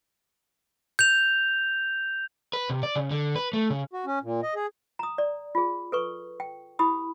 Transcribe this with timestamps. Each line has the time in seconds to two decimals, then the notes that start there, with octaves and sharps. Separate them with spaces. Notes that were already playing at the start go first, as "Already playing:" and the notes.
0.99 G6 F7
2.53 B4
2.70 C3
2.83 D5
2.96 C#3
3.11 D3
3.36 B4
3.53 A3
3.70 C#3
3.93 F#4
4.06 C#4
4.23 A#2
4.43 D#5
4.55 G#4
4.99 A#5 D#6
5.18 D5
5.55 F4 G#4
5.92 A4 B4 C#6
6.40 G5
6.79 E4 G4 B5 D#6